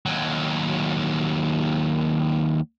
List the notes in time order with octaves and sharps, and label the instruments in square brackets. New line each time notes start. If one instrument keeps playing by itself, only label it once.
[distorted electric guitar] D#2 F#3